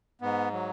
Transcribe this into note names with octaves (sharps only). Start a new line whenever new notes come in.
G#2 B3
F#3